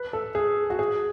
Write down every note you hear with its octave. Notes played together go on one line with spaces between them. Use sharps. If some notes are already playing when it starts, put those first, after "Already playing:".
Already playing: B4
A4
G#4
F#4
G#4